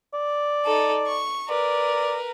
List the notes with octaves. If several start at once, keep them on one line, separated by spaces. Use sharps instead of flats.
D5
D#4 A4
C#6
A#4 B4 D5